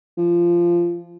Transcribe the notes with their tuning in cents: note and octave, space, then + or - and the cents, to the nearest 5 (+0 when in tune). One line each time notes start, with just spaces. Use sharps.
F3 -15